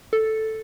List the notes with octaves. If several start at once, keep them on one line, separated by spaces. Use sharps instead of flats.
A4